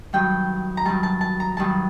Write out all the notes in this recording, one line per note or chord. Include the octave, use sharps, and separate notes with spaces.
G2 D#3 F#3 G5
A#5
G2 D#3 F#3 A5
A5
A5
A#5
G2 D#3 F#3 A5